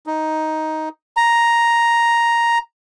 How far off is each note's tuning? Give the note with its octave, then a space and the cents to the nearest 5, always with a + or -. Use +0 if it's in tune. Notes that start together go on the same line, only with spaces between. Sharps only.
D#4 +10
A#5 +5